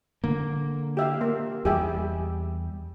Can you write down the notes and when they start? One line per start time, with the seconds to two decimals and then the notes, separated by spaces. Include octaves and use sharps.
0.24 D3 A#3
0.97 G4 E5 F5
1.21 A#3
1.65 E2 G3 G4 G#4 E5